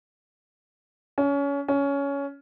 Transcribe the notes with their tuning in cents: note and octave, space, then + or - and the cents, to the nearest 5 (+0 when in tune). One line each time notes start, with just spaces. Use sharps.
C#4 +25
C#4 +15